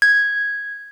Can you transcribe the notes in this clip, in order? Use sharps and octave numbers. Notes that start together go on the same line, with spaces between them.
G#6